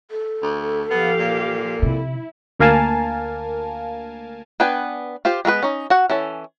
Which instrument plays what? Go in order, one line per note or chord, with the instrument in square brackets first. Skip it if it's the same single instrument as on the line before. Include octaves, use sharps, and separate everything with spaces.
[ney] A4
[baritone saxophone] D2
[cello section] F3 G4 F5 [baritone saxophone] B3
[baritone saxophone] A#2
[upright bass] C3 [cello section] E4
[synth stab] D2 A#3 A#4 F5 G#5 A5
[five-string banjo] B3 D4 B4 G5 G#5
F4 G4 C5
G#3 B3 A#4 B4
C#4 D#4
F#4 F#5
E3 C#4 A4